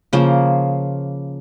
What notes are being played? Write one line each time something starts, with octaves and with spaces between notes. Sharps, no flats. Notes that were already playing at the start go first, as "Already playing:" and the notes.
C#3 F3 A#3 C5